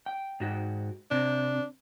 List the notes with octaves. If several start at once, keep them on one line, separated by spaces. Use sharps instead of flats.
G5
G#2 F#4 G5
C3 D4